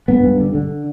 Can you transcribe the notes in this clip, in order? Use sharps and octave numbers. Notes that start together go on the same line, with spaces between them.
G2 B3
G2
D3
D3